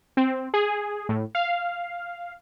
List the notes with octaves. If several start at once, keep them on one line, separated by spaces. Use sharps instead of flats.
C4
G#4
A2
F5